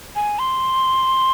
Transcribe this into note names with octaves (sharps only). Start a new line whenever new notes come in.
G#5
C6